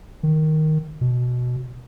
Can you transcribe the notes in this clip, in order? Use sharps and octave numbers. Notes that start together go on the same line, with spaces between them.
D#3
B2